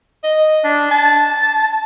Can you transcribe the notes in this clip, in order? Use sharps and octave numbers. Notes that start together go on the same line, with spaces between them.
D#5
D4
A5